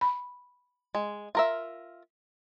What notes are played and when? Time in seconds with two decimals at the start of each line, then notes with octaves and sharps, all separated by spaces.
0.01 B5
0.95 G#3
1.35 F4 A#4 E5